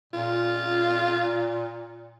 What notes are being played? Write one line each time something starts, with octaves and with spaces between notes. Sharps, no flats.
A#2 F4